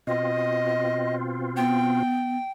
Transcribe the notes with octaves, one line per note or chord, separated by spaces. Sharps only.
B2 C4 F4 D#5
B3 G5